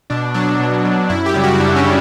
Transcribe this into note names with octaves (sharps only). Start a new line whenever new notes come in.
B2 D4
F#3 D4
B2
F#3
F#2 E4
G4
C#3 G3
F#4
F#2 D4
C#4
C#3 G3